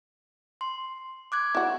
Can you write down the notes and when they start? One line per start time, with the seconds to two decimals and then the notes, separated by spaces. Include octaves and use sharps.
0.61 C6
1.32 D6 F#6 G#6
1.55 E4 F#4